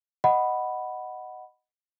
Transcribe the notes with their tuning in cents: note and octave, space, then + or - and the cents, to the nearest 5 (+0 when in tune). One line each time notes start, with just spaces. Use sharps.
D#5 +0 F#5 +0 B5 +0